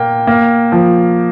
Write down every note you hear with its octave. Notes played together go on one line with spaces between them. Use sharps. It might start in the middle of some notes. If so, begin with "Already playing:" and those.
Already playing: A#2 A#3 G5
A#3
F3